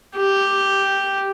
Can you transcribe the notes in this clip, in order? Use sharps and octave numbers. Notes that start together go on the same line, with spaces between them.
G4